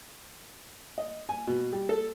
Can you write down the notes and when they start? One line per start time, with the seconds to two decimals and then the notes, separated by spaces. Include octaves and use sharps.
0.98 D#5
1.29 G#5
1.47 B2
1.73 G3
1.89 A4